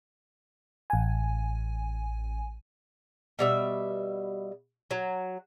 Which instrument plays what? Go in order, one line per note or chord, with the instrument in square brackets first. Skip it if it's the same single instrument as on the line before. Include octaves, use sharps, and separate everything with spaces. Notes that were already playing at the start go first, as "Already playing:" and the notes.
[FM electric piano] A1 G#5
[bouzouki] B2 G3 E5
F#3